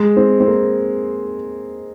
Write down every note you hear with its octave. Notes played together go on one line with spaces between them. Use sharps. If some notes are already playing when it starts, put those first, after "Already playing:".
Already playing: G#3
C4
C4
A#3